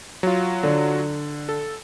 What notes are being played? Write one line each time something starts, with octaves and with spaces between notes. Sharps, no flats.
F#3 F4
D3
A4